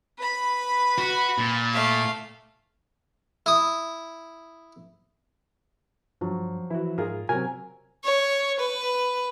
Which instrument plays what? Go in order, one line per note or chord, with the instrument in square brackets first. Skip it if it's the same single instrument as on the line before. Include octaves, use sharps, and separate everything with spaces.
[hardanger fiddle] B4 B5
[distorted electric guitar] F#4
A#2
[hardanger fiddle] A3 F5
[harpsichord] E4 D#6
[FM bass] G2 [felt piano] F3 F#3
[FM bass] E3 [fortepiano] E4 F#4
[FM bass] G#2 [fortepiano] F4 G#4 A#4
[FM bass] C3 [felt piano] F#3 C4 [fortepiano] A#4 [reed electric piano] G#5
[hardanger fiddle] C#5
B4